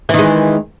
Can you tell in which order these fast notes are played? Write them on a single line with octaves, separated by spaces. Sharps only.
E3 D#3 G#3